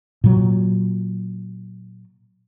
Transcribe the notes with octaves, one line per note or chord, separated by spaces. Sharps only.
A#2 F#3